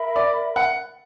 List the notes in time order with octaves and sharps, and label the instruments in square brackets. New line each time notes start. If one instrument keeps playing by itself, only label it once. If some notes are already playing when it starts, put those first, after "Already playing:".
Already playing: [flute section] A#4 E5 B5
[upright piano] D5
F#5